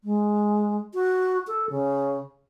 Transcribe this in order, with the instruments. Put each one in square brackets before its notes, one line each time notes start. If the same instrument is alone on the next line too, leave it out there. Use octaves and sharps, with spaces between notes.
[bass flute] G#3
F#4
A4
C#3